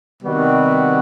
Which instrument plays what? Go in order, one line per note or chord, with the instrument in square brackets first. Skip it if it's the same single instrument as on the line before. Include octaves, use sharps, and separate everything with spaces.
[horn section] C3 D#3 G3 B3 F#4